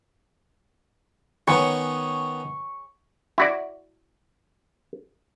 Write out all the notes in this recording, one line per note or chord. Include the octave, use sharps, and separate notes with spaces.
D#3 B3 C#4 C#6
E4 F#4 D5